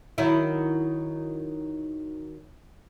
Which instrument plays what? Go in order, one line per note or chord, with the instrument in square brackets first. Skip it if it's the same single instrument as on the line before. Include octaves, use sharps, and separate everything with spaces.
[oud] D#3 F#3 E4